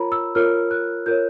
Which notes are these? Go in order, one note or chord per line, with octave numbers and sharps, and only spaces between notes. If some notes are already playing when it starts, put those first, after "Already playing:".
Already playing: F4 A#4 C#5 A#5 B5
E6
F4 A#4 C#5 F6
F#6
F4 A#4 C#5 G6